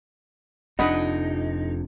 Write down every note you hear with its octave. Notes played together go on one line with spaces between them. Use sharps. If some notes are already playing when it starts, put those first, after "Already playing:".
F1 F2 C3 D4 D#4 D#5 F#5 B5